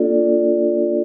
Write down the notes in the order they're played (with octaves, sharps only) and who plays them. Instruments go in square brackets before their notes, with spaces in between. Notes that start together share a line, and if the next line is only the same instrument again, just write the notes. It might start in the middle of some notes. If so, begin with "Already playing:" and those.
Already playing: [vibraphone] A#3 D4 F4 A4 D5